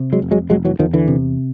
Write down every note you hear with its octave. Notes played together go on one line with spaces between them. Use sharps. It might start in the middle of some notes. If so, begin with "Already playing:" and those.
Already playing: C3
F#3 G#3
F1
F#3 G#3
F1 F#3 G#3
E3 F#3
E2 D#3 F3
D3 E3
C3